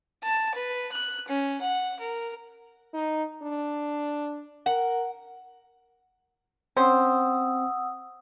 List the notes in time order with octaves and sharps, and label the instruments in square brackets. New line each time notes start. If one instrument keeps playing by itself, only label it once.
[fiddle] A5
B4
F#6
C#4
F#5
A#4
[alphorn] D#4
D4
[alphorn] A#4 [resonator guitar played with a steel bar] F#5
[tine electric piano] C4 [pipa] C#4 C5 [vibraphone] F#5 D#6 E6